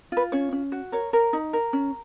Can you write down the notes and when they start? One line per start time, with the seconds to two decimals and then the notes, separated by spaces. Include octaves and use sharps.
0.12 F4 B4
0.32 C#4 C#5
0.52 C#4
0.72 F#4
0.92 A#4 C#5
1.13 A#4
1.33 D#4
1.53 A#4
1.73 C#4